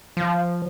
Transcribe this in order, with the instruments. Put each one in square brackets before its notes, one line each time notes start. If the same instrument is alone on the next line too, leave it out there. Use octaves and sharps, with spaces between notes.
[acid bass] F3